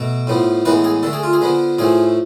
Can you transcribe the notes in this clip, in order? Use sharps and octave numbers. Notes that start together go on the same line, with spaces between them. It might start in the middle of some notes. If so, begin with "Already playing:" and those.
Already playing: B2 A3
A2 F3 B3
A2 E3 G#3 B3 B4
G#4
D3 A3 A4
G#4
F4
G#4
D3 F3 B3
A2 F3 A3 G#4